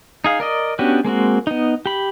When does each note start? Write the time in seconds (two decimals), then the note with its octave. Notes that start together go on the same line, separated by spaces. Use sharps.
0.24 D#4 G#4 F5
0.40 A#4 D5 D#5
0.79 B3 C#4 D4 F#4 G4
1.04 G#3 A#3 C4 F#4
1.47 B3 D#4
1.86 G4 B5